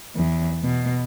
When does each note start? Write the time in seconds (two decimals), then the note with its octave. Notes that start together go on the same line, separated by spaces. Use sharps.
0.16 E2
0.63 B2